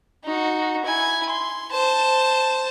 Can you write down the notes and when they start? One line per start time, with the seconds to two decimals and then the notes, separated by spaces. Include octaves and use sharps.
0.25 D#4 F#4
0.85 E4 G#5
1.30 C6
1.72 C5 A5